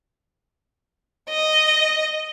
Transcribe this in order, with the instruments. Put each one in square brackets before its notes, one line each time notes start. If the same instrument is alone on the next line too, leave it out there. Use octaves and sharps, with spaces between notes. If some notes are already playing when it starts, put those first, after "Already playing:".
[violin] D#5